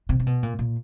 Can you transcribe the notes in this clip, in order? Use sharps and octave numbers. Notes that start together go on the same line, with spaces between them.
C3
C3
B2
A#2
A#2